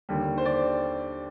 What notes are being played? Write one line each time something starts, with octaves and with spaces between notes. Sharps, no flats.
D#2 D3 G3
C5
D5